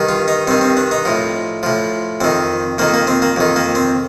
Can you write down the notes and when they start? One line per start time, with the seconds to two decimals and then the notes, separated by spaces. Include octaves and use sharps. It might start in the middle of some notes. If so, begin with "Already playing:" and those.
Already playing: G2 D#3
0.09 F4
0.28 D#4
0.47 G2 D#3 C4
0.61 C4
0.77 D4
0.91 D#4
1.05 A2 F3
1.63 A2 F3
2.21 F2 D#3 C4
2.78 F2 D#3 A#3
2.94 A#3
3.07 C4
3.22 A#3
3.36 F2 D#3
3.56 A#3
3.75 C4